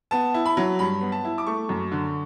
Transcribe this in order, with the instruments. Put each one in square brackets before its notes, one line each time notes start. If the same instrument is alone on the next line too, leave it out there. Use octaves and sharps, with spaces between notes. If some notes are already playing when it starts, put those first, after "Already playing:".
[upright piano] B3 A5
E4
B5
F#3
G2 B5
B3
A5
E4
D6
A3 C#6
F#2
D3